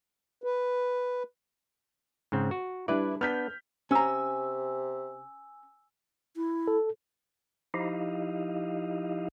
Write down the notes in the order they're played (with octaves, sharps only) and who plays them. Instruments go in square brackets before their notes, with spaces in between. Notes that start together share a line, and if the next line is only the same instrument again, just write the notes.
[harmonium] B4
[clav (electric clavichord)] G#2 C#3 C4
F#4
[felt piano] G3 D4 E4 [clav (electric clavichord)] B4 D5
[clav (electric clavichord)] B3 D4 [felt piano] F6 G6 B6
[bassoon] C3 [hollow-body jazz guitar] C#4 A#5 [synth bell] G#5 E6
[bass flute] E4
[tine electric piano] A4
[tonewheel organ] F3 D#4 E4 G4 D#5 F5